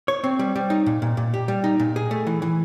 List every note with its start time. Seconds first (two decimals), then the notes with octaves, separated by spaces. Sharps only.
0.08 C#5
0.24 C4
0.39 G3
0.56 G3
0.70 D#4
0.86 A#2
1.02 A#2
1.17 A#2
1.34 G4
1.48 G3
1.64 D#4
1.80 A#2
1.96 G#4
2.11 A3
2.27 E3
2.42 E3